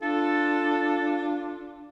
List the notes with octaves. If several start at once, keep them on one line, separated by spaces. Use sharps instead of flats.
D4 F4 A4